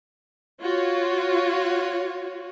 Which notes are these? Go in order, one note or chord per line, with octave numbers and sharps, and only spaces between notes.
F4 F#4 C#5